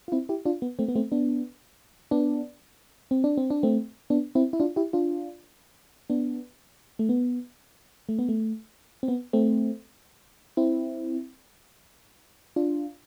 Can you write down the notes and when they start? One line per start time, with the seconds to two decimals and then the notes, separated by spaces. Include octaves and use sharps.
0.08 F4
0.12 C4 E4
0.29 E4 G4
0.45 D4 F4
0.62 B3
0.79 A3 C4
0.88 B3
0.95 A3 C4
1.12 B3 D4
2.11 B3 D4
3.11 C4
3.24 D4
3.37 C4
3.50 D4
3.63 A3 C4
4.10 B3 D4
4.35 C4 E4
4.53 E4
4.60 D4 F4
4.76 E4 G4
4.93 D4 F4
6.10 B3 D4
6.99 A3
7.09 B3
8.09 A3
8.19 B3
8.29 A3
9.03 C4
9.08 B3
9.33 A3 C4
10.57 C4 E4
12.56 D4 F4